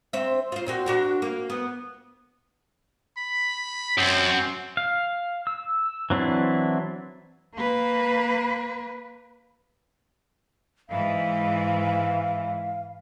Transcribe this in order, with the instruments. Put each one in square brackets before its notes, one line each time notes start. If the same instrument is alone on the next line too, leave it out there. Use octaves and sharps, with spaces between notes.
[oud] C4 E5
F4 C5
A#2 C4 F#4
D4 F#4 A#4
A#3
B3
[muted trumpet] B5
[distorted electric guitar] F#2 [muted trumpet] C4
[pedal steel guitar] F5
E6
E3 F#3 C4 D4 E4
[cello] A#3 B4
[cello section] G#2 E3 [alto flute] F5